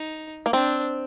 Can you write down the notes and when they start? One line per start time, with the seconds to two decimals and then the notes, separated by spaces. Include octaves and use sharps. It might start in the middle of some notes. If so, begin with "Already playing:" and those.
Already playing: D#4
0.46 A#3
0.53 C4 D4